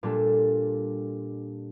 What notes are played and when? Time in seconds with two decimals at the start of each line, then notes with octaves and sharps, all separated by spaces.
0.03 A#2 G3 D4 A4